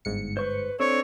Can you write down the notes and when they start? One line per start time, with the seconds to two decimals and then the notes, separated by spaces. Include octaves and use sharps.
0.05 G1 G#2 C#7
0.37 B4 C5 C#6
0.80 C4 D4 A4 C5 C#5